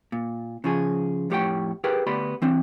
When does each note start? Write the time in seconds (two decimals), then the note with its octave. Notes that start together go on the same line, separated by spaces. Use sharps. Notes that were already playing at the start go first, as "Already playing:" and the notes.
0.12 A#2
0.64 C#3 F3 G#4
1.30 F2 A2 G4 C#5 F#5 G5
1.84 G4 G#4 A#4 B4 G5
2.07 D2 B3 G4 D5 B5 C6
2.42 E3 C4 D4